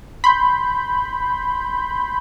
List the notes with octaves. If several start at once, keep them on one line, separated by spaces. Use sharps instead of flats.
B5 C6 G6